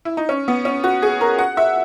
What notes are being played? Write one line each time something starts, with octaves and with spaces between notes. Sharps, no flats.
E4
D#4
C#4
B3
C#4
F#4
G#4
A#4
F#5
E5